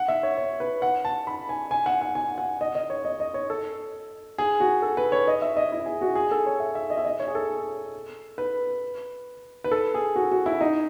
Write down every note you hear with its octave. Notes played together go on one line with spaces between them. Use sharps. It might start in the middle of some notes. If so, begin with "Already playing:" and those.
Already playing: F#5
E5
C#5
C#5
B4
F#5
A5
B5
G#5
G#5
F#5
F#5
G#5
F#5
D#5
D#5
C#5
D#5
D#5
C#5
A4
G#4
F#4
A4
B4
C#5
D#5
E5
D#5
E4
G#4
F#4
G#4
A4
C#5
E5
E5
D#5
E5
D#5
C#5
G#4
A4
B4
B4
A4
G#4
F#4
F#4
E4
D#4